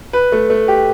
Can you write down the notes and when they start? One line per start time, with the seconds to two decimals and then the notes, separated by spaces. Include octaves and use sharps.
0.13 B4
0.32 A3
0.50 A3
0.68 G4